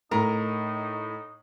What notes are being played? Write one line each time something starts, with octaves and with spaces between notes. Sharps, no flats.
A2 D#4 A#4